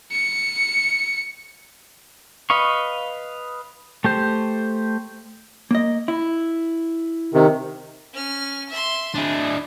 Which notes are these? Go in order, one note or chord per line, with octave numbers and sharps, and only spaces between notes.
C#7
B4 D#5 F5 C#6
A3 G4 C5
A#3 D#5
E4
C3 D#3
C#4 F6
E5 C6
D4 E4 G#4